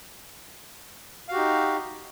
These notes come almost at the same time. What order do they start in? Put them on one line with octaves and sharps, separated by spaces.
F5 F#4 G4 D#4